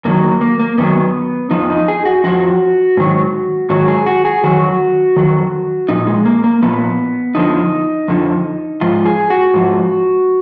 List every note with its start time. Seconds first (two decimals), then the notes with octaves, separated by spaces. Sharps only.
0.05 F#2 D#3 F#3 A#3
0.23 A#3
0.41 A#3
0.60 A#3
0.78 F#2 D#3 F#3 B3
1.51 F2 F3 D#4
1.70 D#4
1.88 G#4
2.05 F#4
2.24 F2 F3 F#4
2.97 G#2 D#3 F#3
3.70 G#2 D#3 F#3 F#4
3.88 G#4
4.06 F#4
4.25 G#4
4.44 F2 D#3 F#3 F#4
5.16 F2 D#3 F#3
5.89 A#2 F3 D#4
6.07 G#3
6.25 A#3
6.44 A#3
6.62 A#2 F3 B3
7.35 F2 D3 F3 D#4
8.08 F2 D3 F3
8.81 G#2 F3 F4
9.06 G#4
9.30 F#4
9.54 G#2 F3